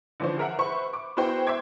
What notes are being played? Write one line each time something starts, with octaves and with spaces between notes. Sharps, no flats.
D3 E3 F3 C#4 C5
G#4 A#4 E5 F#5
B4 C5 E5 B5 C#6
D6
B3 E4 F#4 G#4 C5 G5
C5 E5 G5 C6 D6 G#6